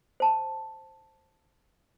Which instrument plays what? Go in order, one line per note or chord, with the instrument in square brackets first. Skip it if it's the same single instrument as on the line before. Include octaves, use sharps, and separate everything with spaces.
[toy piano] C5 A5